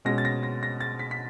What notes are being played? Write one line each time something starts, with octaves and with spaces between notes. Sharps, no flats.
B2 G#3 C#4 A#6
A6
A#6
A#6
A#6
A6
B6
B6